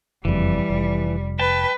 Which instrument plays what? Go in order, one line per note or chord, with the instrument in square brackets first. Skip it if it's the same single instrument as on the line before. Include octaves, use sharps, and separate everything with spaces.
[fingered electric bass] F#1 F2 [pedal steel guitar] E3 [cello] G3
[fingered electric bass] F1
[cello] B4 [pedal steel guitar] G5 A5